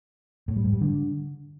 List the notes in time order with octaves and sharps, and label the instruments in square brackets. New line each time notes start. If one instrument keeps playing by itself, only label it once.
[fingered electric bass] A2
G3
G#2
G3
D3